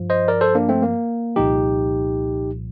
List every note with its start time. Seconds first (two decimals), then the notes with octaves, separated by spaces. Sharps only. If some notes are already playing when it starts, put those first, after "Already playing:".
Already playing: G2 F3
0.10 C5 D#5
0.28 A#4 D5
0.41 A4 C5
0.55 A#3 D4
0.69 A3 C4
0.82 A#3
1.36 C2 A#2 F3 D#4 G4